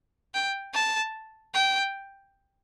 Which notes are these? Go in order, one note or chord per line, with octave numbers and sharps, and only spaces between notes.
G5
A5
G5